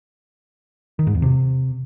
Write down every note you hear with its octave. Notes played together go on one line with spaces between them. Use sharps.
D#3
G#2
E2
C3